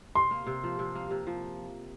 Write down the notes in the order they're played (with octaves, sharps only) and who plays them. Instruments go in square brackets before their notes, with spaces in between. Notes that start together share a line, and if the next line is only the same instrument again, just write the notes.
[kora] C3 [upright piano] C6
[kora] A#3
C3
F3
C3
A#3
C3
F3